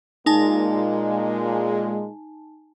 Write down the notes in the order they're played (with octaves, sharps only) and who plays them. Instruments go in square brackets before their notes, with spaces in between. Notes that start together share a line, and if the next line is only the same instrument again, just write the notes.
[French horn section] A#2 G#3 [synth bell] D#4 G#5 A5